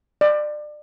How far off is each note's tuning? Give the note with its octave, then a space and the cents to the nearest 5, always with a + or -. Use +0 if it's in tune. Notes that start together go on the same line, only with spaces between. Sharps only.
D5 +30